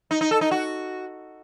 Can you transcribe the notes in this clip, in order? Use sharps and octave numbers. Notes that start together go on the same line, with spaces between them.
D#4
D#4
A4
D#4
F#4